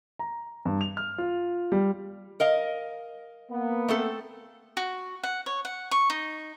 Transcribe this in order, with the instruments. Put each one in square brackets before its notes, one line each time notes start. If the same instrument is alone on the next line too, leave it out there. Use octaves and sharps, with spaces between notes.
[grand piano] A#5
G2
F7
F6
F4
G3
[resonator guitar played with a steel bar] A#4 D#5 F5
[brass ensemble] A#3 B3
[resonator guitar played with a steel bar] A3 C4 A4
[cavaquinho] F#4
F#5
C#5
F#5
C#6
D#4